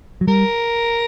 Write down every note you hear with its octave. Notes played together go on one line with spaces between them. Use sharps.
F#3
G3 A#4